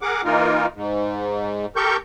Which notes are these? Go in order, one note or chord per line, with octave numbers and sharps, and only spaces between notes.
G#4 A#4 F#5 D6
E3 A#3 D#4 F4 A#4
G#2
G4 A4 A#4 C#6 G6